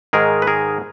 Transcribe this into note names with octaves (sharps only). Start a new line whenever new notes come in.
G#2 D#3 G#3 G#4 A#4
B4
G#4 A#4